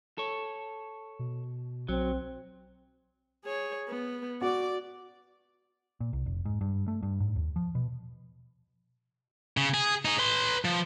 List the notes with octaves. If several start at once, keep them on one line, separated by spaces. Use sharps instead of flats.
A4 C#5
B2
B1 F#3 C4
G#4 C#5
B3
F#4 D5 D6
A#2
C2
F1
G#2
G2
A3
G2
G#2
D#2
F3
B2
C#3
G#4
D#4 G#4
B4 C6
F3